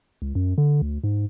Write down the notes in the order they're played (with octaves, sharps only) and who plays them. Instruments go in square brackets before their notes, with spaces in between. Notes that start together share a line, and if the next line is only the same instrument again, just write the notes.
[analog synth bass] C#2
F#2
D3
D2
G#2